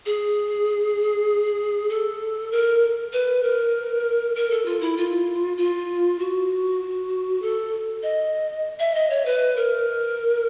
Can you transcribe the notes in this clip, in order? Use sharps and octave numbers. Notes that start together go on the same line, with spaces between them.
G#4
A4
A#4
B4
A#4
A#4
A4
F4
E4
F4
F4
F#4
A4
D#5
E5
D#5
C#5
B4
A#4